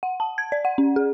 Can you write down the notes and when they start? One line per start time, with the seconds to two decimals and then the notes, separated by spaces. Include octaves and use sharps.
0.03 F#5
0.20 A5
0.38 G#6
0.52 D5
0.65 F#5
0.78 C#4
0.96 G#4